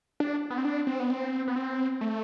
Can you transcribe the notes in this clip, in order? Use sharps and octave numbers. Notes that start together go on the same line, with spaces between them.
D4
B3
C4
D4
C4
B3
C4
B3
C4
A3